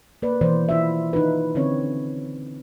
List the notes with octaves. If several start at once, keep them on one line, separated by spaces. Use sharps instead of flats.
A#3 B4 D5
B2 D#3 E3 C5 D5
E4 F4 E5
D#3 D#4 F4 B4
D3 C4 C#4 C#5